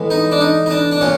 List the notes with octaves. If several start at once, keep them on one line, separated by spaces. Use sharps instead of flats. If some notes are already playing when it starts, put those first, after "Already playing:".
Already playing: A2 E3 G#3 B3
D#4
D4
D#4
D#4
D4
D4
A#2 C#4